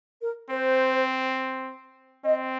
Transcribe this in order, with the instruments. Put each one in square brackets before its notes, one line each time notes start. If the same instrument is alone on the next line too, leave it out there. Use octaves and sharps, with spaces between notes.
[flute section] A#4
[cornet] C4 [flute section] C5
[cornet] C4 [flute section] D#5